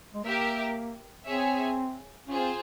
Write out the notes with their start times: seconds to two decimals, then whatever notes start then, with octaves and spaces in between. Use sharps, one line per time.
0.15 G#3
0.24 A#3 G4 A#4 E5
1.26 C4 G#4 C#5 E5 G#5
2.28 C#4 F4 G#4 C5
2.40 C4